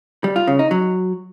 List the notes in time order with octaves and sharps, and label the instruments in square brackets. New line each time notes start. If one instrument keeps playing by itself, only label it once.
[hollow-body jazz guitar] G3
F4
C#3
D#4
F#3